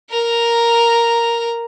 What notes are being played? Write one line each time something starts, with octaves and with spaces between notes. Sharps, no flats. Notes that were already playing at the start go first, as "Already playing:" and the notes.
A#4 A#5